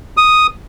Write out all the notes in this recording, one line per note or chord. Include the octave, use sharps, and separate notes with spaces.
D#6